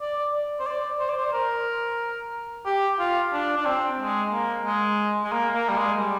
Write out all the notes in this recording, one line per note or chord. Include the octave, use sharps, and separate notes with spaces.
D5
C5
D5
C5
D5
C5
A#4
G4
F4
D4
D4
C4
G#3
A#3
G#3
G#3
A#3
A#3
G3
G#3
G3